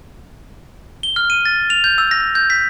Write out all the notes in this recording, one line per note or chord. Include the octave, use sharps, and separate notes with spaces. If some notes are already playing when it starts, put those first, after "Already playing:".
G7
F6
D#7
A6
F7
G6
E6
A#6
G6
B6